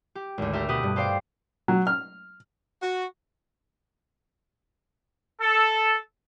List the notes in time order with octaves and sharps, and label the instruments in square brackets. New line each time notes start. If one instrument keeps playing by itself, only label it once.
[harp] G4
G#1 D2
G4 A4 A#4 E5
B2 G4 B4 D#6
G2
G4 C5 D5 F5 G5
[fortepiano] F#3
F6
[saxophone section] F#4
[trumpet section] A4